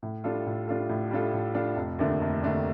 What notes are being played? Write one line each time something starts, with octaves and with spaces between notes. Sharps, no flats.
A2
G3 D4 F4 A4
A2
G3 D4 F4 A4
A2
G3 D4 F4 A4
A2
G3 D4 F4 A4
F1
D#2 D3 A3 D4
F1
D#2 D3 A3 D4